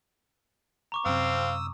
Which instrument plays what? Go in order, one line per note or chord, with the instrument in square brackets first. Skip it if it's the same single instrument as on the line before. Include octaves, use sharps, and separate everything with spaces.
[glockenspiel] A#5 C#6 D6
[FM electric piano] F#2 C3 [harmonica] C4 F5 [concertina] D#6 E6